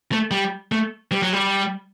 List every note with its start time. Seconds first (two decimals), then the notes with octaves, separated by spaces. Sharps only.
0.12 A3
0.31 G3
0.72 A3
1.12 G3
1.22 F#3
1.33 G3